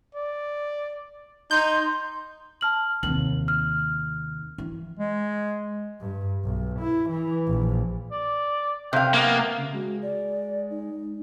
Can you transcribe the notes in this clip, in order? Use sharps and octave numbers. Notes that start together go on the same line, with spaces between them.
D5
D#4 C6 G6
A5 F6 F#7
D#2 C3 F#7
F6
E3
G#3
G2
B1
E4
E3
A#1
D5
C3 F5 G5
A#3 B3
C#3
G#3 F#4
D5
D#4